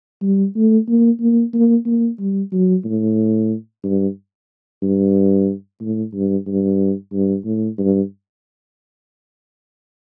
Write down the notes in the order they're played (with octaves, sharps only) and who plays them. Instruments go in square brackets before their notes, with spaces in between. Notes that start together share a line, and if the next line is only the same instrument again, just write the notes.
[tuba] G3
A3
A#3
A#3
A#3
A#3
G3
F#3
A2
G2
G2
A2
G2
G2
G2
A2
G2